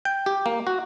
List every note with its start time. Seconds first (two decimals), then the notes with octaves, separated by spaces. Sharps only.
0.05 G5
0.26 G4
0.46 A#3
0.67 F#4